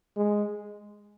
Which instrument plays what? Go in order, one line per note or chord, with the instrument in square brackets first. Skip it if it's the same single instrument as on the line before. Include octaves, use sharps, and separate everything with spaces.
[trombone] G#3